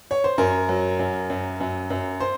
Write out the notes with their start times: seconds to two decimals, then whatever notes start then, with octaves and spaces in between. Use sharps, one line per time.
0.11 C#5
0.24 C5
0.38 F#2 A#4
0.69 F#3
0.99 F#2
1.30 F#2
1.60 F#2
1.90 F#2
2.20 C5